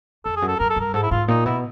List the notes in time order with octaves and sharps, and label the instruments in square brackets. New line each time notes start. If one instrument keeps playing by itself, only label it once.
[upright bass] F2 [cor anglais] A4
[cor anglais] G#4
[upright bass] F#2
[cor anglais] A4
[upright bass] F#2 [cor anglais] A#4
[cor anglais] A4
[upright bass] G2 [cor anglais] A#4
[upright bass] G#2 [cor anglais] A4
[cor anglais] E4
[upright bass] G#2 [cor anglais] F4
[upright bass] A#2 [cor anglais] D#4
[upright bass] B2 [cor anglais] E4